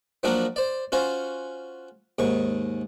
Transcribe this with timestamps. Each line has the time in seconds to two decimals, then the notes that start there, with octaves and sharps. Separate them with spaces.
0.23 F3 F#3 A#3 D4 F#4 A#4
0.56 C5 D5
0.92 C#4 F4 F#4 C5
2.19 D#2 G#2 C#6